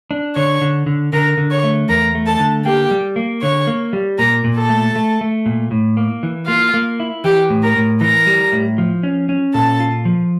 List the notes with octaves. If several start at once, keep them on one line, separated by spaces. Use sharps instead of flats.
D4
D3 C#5 C#6
D3
D3
D3 A#4 A#5
D3
C#5 C#6
A3
E2 A#4 A#5
A3
A4 A5
D3
A#3 G4 G5
G3
A#3
D3 C#5 C#6
A#3
G3
A#2 A#4 A#5
A#2
A4 A5
A3
A3
A3
A#2
A2
A#3
E3
A#3 F4 F5
A#3
E4
E3 G4 G5
A2
A#4 A#5
A2
E3 A#4 A#5
G3
A2
F3
C#4
C#4
A#2 A4 A5
F4
F3